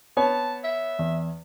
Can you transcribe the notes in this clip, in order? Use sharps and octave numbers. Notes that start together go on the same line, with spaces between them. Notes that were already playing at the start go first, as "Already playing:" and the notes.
B3 C#5 A5
E5
E2